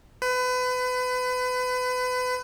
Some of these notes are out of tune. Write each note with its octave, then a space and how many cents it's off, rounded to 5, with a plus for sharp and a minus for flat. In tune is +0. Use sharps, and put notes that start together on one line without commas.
B4 +30